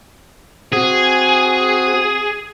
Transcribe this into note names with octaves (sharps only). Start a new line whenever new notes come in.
C4 F#4 G#4